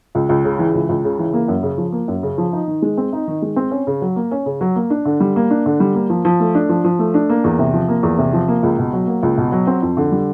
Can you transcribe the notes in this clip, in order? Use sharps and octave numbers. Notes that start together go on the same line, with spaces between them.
C#2
C#2
C#3
E3
C#2
C#2
C#3
E3
A#3
F#2
C#3
F3
A#3
F#2
C#3
F3
D#4
D#3
G#3
C4
D#4
D#3
G#3
C4
C#4
C#3
F#3
A#3
C#4
C#3
F#3
A#3
D4
D3
G3
A#3
D4
D3
G3
A#3
F3
F3
A3
D4
F3
F3
A3
D4
A#3
E2
C3
F3
A#3
E2
C3
F3
A#3
C#2
B2
F#3
A#3
C#2
B2
F#3
C4
F2
D3
G3